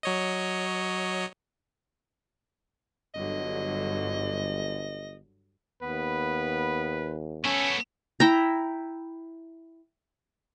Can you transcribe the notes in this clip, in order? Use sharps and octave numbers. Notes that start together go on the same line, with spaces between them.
F#3 C#5 D#5
G1 G2 D3 F#3 D#5
D#2 B3 B4
B3 C#4 A4 C#5
E4 G5 A#5